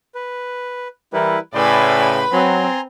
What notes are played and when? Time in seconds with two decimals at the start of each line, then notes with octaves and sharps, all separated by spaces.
0.15 B4
1.13 E3 G3 E4 A#4 B4
1.54 A2 C#3 B4 D5 G5 G#5 B5 C6
2.33 F#3 C4 G#5 A#5 C6